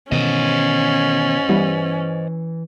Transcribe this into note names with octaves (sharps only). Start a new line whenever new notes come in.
B2 D#3 E3 C#4 C5 D#5
E3 G3 B3 E4